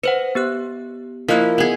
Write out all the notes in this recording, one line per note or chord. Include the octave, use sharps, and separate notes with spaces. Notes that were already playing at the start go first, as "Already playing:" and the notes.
B4 C5 D#5 F#5
B3 G4 F#6
F3 A#3 E4 A#4 D#5 F#6
B3 G#4